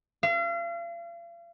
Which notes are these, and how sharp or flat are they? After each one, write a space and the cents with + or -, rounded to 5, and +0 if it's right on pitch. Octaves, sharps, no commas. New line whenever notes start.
F5 -40